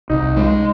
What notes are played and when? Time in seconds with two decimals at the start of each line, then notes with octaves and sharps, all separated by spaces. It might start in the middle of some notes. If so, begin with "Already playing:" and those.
0.10 C2 D#4
0.37 G#3